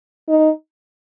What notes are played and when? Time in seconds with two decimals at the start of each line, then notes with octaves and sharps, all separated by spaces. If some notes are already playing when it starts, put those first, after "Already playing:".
0.29 D#4